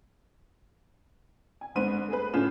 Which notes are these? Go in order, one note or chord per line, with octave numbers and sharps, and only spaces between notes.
G#5
G1 G#2 B3 C4 C6 D#7
A3 G#4 B4
A2 D3 C#4 F4 E7